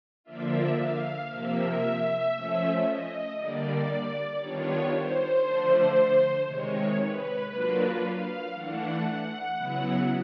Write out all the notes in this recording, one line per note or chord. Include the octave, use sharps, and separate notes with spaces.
D3 F3 A#3 D4 F4 E5
F5
C3 F3 A#3 E5
F3 A3 C#4
D#5
D3 G3 A#3 D5
D#3 G3 B3 D4 F4 C#5
C5
D3 F3 A3 D4
C3 D#3 G#3 C#5
B4
F#3 A#3 D4 F4 B4
F5
E3 A3 D4 F#5
F#5
C#3 F#3 B3 E4